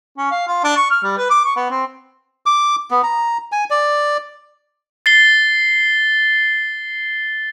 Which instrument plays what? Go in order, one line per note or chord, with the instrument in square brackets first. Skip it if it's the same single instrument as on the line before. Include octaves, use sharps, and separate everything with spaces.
[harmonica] C#4
F5
F4
D4
C#6
F6
G3
B4
D6
C#6
B3
C4
[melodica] D6
B3
A#5
G#5
D5
[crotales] A6 C7 G7